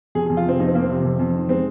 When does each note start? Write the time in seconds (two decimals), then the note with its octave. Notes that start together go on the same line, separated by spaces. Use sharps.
0.15 F2 G#4
0.26 F2 G#4
0.37 F4
0.45 C3 C4
0.60 F2 D#4
0.67 C4
0.75 F2 A#3
0.82 C4
0.89 C3
1.05 F2
1.19 F2
1.34 D#3
1.49 G#3 C4